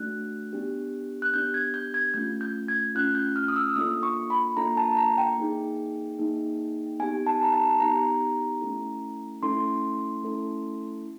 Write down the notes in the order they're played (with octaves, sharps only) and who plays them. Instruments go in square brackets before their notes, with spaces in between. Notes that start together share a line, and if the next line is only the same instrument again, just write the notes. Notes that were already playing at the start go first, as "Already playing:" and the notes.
Already playing: [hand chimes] A3 D4 F#4 F#6
B3 D4 G4
F#6
B3 D4 G4 G6
G#6
G6
G#6
A3 C#4 F4 G6
G6
G#6
A3 C#4 F4 F#6
G6
F6
D#6
E6
A#3 D4 F4 A4 D#6
C#6
B5
A#3 D4 F4 A4 A#5
A5
A#5
G5
A#3 D#4 G#4
A#3 D#4 G#4
B3 D#4 G4 G#5
A5
A#5
A5
B3 D#4 G4 A#5
A3 C#4 E4 A4
A3 C#4 E4 A4 C6
A3 C#4 E4 A4